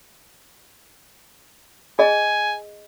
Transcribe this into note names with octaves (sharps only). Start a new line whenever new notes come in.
G#4 D#5 G#5